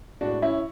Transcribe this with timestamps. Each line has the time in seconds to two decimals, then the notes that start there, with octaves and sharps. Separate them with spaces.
0.21 A2 G#3 D4 F#4
0.42 C#4 E4